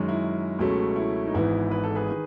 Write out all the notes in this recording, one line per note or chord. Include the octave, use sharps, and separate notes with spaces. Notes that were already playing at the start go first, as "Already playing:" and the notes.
Already playing: F#2 D#3 G#3 C#4
E4
C#2 B2 F#3 A3 C#4
E4
D#4
G#1 G#2 E3 B3 E4
B4
A4
G#4 B4
D#3